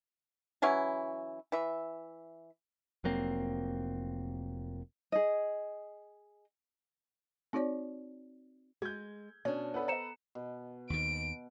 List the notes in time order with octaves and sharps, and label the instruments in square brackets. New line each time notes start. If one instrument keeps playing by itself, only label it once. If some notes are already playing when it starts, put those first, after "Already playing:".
[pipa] E3 F#3 C#4 E4
E3 E5
[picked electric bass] F1 F#3 A#3 C4
[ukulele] G#4 D#5
[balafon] C4 D#4 F#4 C#5 D5
[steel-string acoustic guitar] G#3 [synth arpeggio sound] F#4 [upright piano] G6 G#6
[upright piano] B2 [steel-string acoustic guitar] C#4 D4 [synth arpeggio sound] C#5
[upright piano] B3 A4 B4
[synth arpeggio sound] C5 D#5 [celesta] A#5 C#7 E7
[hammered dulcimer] B2
[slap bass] D#2 D#3 [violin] D7